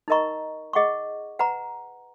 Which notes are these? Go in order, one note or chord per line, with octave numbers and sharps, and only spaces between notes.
D#4 A#4 D#5 A#5 C#6
G#4 D#5 F#5 C#6
B4 F#5 A#5